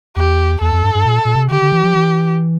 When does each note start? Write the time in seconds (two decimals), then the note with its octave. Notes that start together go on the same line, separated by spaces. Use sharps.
0.16 E2 G4
0.61 E2 A4
0.72 F2
0.84 G2
0.95 G2
1.06 A#2
1.25 A#2
1.35 C3
1.50 D3 G4
1.62 D3
1.72 E3
1.84 F3
1.95 E3